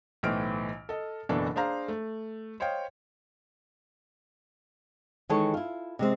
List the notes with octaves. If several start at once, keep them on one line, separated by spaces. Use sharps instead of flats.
B1 A2 E3 C5 F6 D7
A4 D#5
F#1 B2 E3 D4 A4 A5
D4 G#4 C5 F5 A#5
A3
C5 C#5 D#5 F5 G5
D#3 E3 G#3 G#4 A4 C#5
E4 F4
C3 G#3 C4